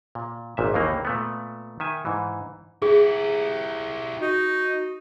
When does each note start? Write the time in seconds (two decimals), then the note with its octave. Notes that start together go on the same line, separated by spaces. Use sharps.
0.15 A#2
0.57 G#1 A#2 E5
0.74 D#2 D#3 E3 A#3 D#4
1.05 A#2 A3 B3
1.80 D#3 E5 G#5
2.05 G#2 E3
2.82 E4 G4 G#4
4.20 D#4 F#4